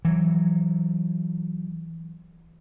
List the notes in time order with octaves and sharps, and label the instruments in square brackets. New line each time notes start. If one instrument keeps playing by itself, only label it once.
[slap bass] E3 F#3